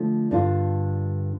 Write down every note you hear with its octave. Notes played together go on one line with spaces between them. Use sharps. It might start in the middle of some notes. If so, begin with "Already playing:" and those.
Already playing: D3 F3 A3 D4
G2 D3 G3 D4 F4